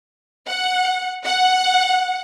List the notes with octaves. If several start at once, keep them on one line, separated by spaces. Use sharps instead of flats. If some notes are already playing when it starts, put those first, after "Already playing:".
F#5
F#5